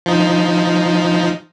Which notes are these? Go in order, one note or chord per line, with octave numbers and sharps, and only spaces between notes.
F3 D#4